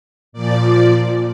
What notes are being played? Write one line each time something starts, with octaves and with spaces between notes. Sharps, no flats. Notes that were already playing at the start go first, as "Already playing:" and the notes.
A#2 F3 D5